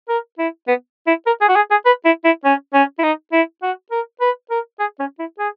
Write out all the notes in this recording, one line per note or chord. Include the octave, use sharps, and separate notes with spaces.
A#4
E4
B3
E4
A#4
G#4
F#4
G#4
G#4
B4
E4
E4
C#4
C#4
E4
D#4
E4
F#4
A#4
B4
A#4
G#4
C#4
E4
G#4